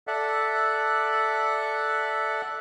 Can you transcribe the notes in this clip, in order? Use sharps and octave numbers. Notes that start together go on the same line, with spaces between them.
A4 D5 E5 F#5